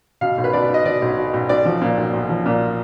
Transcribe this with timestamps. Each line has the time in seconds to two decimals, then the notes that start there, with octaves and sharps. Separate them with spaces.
0.21 B2 F5
0.38 B1
0.44 B4
0.53 B2 D5
0.69 B1 D#5
0.85 B2 D5
1.02 B1
1.17 B2
1.34 B1
1.49 B1 D5
1.65 F3
1.81 A#2
1.98 B1
2.13 B1
2.29 F3
2.45 A#2